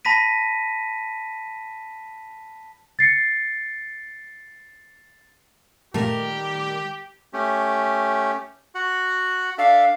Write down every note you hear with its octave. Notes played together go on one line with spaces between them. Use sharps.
A5 B5 A#6 B6 D#7
A6 C7 C#7
A#2 D#3 G3 A3 G4 A#4
A3 C#4 G4
F#4 F#5
D4 A4 E5 F5